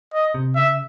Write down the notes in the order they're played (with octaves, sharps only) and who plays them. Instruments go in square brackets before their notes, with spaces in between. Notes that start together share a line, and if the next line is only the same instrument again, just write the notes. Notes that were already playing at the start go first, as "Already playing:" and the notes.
[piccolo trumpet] D#5
[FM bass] C3
[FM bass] C#3 [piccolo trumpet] E5